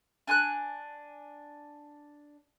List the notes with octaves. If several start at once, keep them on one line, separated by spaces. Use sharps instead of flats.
D4 G#5 C#6 F#6